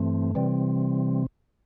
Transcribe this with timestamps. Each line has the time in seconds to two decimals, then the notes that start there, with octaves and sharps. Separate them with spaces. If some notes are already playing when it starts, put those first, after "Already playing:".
Already playing: G2 E3 A3 C4
0.35 C3 E3 G3 C4